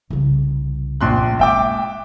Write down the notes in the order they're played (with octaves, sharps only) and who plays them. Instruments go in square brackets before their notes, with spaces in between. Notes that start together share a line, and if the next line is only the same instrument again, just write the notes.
[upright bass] C2 C#3
[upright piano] A#1 C6 F#6
[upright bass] G#3 A#3 [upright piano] E5 G5 D6